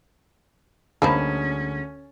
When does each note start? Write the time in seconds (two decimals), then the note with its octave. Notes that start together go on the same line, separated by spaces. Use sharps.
1.02 D2 G3 A#3 C#4 D#4 G#4 C5 A5